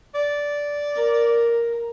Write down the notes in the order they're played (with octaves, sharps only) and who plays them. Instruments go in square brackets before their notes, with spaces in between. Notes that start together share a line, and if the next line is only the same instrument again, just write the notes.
[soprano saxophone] D5
[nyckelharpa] A#4